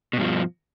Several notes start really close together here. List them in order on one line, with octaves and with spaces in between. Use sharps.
B2 G2 F3